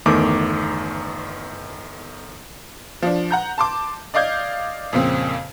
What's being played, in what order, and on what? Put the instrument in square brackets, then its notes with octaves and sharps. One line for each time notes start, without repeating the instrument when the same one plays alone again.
[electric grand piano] G1 E2 D#3 A3 D6
[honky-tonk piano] F3 D4
F#5 A#5 G6
A5 C6 D6
D5 D#5 F5 D6 G6 G#6
F2 A#2 C#3 C4